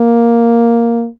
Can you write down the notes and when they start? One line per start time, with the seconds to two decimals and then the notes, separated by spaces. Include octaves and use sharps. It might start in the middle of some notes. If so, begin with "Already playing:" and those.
Already playing: A#3